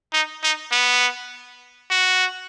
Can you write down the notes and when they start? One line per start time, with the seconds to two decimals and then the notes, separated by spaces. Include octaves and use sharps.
0.13 D#4
0.43 D#4
0.72 B3
1.90 F#4